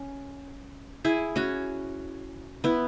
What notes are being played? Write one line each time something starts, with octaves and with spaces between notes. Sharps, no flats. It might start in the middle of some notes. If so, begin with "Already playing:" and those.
Already playing: C#4
E4 G#4
C#4 F#4
B3 E4